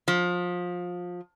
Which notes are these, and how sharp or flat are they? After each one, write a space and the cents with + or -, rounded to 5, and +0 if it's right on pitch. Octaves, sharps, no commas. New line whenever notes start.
F3 +25